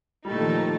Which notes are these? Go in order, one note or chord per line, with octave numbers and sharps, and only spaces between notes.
A#2 G3 A3 D#4 A4
D#3
F3
D#3